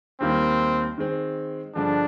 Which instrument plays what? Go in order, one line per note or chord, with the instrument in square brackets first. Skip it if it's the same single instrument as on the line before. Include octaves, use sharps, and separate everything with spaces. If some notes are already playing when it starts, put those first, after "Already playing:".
[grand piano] D#2 D#3 G3 A#3 [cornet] C4
[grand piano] D#3 G#3 C4
[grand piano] G2 D3 F3 G#3 [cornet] D4